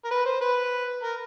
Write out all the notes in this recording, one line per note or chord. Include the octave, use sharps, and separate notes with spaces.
A#4
B4
C5
B4
A#4